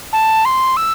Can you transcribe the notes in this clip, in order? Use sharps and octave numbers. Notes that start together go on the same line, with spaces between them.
A5
C6
E6